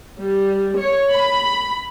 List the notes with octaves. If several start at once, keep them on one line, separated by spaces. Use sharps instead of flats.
G3
C#5
B5